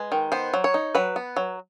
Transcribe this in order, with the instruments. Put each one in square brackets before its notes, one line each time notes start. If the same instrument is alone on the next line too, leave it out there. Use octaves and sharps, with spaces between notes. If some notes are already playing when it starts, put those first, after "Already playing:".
Already playing: [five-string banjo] G#3 B4
D#3
B3 C5
F#3
C#5
D#4
F#3 B4
B3
F#3